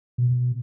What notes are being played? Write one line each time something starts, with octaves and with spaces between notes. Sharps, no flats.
B2